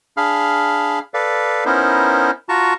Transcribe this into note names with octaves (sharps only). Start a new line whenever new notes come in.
D4 G#4 F5 B5 F6
A4 B4 D5 F5
B3 C#4 D#4 E4 A#4 C5
F4 F#4 A5 A#5 C#6